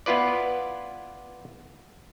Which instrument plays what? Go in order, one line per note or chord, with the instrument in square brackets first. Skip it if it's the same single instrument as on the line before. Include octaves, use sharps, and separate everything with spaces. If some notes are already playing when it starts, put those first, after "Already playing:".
[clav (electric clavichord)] B3 E4 F4 B4 D5